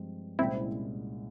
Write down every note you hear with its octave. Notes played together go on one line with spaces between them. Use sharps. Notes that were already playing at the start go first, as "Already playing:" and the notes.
Already playing: G2 F3 G#3 C4
C2 A#2 G#3 C4 C#4 E4